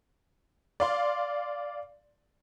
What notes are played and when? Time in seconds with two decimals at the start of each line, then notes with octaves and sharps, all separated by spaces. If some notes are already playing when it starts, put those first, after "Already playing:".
0.80 D5 F5 C6